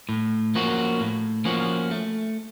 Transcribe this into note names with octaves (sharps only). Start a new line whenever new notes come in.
A2
F3 A#3 C#4 F#4
A2
F3 A#3 C#4 F#4
A3